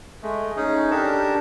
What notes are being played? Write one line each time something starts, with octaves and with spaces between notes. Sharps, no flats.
G#3 A3
C#4 D#4 G#4
D4 G4 A4 A#4 A5